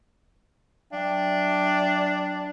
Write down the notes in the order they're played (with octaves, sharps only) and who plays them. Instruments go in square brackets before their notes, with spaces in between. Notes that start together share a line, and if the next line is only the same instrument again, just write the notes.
[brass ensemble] F#3 E5 G5 [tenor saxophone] D4